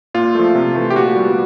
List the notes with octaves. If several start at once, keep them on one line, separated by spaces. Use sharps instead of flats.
A#2 F4
F3 A3
C3
E3 A3
G4
A#2 F#4
G3 B3